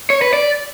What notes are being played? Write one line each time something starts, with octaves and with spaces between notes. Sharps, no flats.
C#5
B4
D5